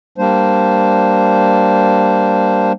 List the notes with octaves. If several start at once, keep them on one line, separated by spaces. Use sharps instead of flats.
G3 A#3 D4 C5